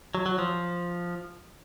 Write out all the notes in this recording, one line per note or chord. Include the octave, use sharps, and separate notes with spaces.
F#3
F#3
F3